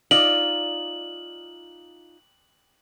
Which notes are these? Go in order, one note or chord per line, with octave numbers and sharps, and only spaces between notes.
D#4 F4 D5 F#7